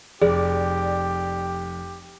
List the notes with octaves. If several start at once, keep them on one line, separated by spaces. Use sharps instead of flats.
F1 G4 G#4 D5